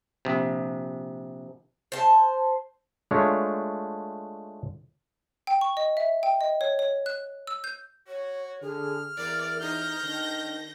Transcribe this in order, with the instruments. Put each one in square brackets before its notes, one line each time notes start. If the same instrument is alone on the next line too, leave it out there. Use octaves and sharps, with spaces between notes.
[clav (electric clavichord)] A#1 C3
[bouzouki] C5 A5
[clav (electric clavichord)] G#3 A3 D4 F4 C#5
[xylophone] G5
C#6
D#5
E5
G5
D#5
C#5
C#5
F#6
E6
G6
[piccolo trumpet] F#4 [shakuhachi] C#5
[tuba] D3 [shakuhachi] G#4 [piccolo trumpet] F6
[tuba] E2 [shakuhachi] A#4 [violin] D5
[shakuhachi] D#4 [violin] G6 A#6
[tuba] D#3 [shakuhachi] D4